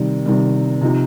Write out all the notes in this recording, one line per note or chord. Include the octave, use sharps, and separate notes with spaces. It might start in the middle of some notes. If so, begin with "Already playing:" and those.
Already playing: C3 D#3 G3
C3 D#3 G3
C3 F3 D#4